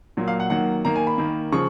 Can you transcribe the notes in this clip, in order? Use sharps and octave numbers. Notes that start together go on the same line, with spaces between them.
A#2 F#3 A#3
F5
F#5
D#3 F#3 A#3 F#5
D#3 A#3 A#5
G#5
B5
D#3 A#3
C#3 F3 C#6